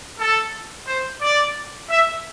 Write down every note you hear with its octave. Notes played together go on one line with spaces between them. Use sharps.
A4
C5
D5
E5